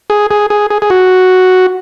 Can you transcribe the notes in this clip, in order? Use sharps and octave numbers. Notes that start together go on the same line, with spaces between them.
G#4
G#4
G#4
G#4
G#4
F#4